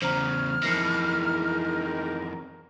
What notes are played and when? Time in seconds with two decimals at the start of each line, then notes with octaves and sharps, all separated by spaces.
0.02 E2 C#3 C5 A#5 F6
0.63 F2 E3 G#3 D#4 A#4 A#6 C7 C#7